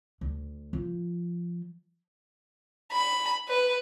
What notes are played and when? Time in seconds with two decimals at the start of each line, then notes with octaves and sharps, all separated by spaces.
0.21 D2
0.73 F3
2.92 B5
3.49 B4